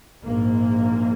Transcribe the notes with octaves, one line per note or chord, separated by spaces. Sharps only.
A#1 G#2 A#3